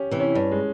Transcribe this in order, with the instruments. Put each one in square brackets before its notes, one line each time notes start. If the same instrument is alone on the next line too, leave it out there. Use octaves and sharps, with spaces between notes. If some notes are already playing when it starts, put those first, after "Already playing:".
Already playing: [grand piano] C#4 G4
[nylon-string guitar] C3 E3
[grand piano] C#4
[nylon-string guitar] G2
[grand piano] G#3